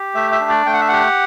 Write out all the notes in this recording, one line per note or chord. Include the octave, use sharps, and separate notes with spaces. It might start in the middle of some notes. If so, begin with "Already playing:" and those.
Already playing: G4
A3 E5
E5
D4
D5
A3 G5
F#5
E5
G4 F#5